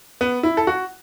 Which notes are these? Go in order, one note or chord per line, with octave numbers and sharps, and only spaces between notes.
B3
E4
A4
F#4